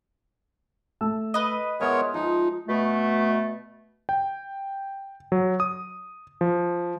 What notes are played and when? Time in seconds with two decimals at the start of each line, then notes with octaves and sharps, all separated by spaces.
1.01 A3 A5 E6
1.34 B4 D#5
1.81 G#3 B3 A#4 C#5 E5
2.14 F3 D#4
2.68 B2 A3
4.09 G5
5.32 F#3
5.60 D#6
6.41 F3